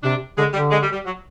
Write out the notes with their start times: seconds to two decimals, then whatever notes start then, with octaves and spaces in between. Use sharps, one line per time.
0.03 C3 D4
0.38 D3 G#3
0.54 D3 G3
0.71 G#3
0.83 G3
0.93 G3
1.05 F#3